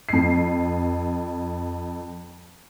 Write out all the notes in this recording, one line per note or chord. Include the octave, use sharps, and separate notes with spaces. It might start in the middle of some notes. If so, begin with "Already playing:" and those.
F2 C7